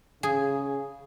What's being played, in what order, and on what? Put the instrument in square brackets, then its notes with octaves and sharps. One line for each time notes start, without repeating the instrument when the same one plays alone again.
[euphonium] C#3 [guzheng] G#4